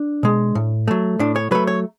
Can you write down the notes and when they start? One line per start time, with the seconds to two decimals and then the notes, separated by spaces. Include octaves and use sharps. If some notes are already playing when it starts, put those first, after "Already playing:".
Already playing: D4
0.23 B2 G#3
0.55 A2
0.88 F#3 A3
1.19 A2 D4
1.36 C#5
1.51 F#3 A3 B4
1.67 C#5